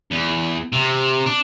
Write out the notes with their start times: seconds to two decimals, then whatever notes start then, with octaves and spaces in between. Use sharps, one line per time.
0.11 E2
0.72 C3
1.26 D4